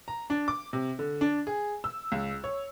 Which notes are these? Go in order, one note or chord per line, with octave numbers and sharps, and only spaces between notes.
A#5
D4
D6
C3
D3
D4
G#4
E6
C#2
C#5